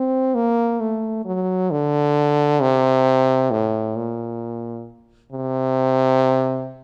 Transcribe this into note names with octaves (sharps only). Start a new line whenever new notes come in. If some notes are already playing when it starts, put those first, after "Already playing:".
Already playing: C4
A#3
A3
F#3
D3
C3
A2
A#2
C3